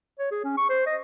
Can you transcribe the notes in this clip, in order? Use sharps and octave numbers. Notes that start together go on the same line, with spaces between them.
C#5
G#4
C#4
C#6
C5
D#5